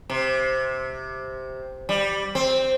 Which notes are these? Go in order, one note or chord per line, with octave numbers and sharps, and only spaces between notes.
C3
G3
C4